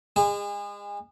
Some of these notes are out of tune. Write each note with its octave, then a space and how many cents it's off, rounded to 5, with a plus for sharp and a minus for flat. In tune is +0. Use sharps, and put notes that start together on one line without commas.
G#3 -30 G#4 -35